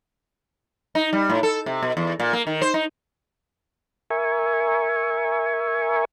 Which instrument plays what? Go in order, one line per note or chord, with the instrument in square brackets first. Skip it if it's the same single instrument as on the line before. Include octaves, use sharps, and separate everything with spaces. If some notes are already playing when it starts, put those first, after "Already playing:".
[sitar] D#4
G3
A2
A4
C3
B2
E2
A#2
A#3
D#3
C5
D#4
[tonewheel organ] A#4 E5 G#5 C#6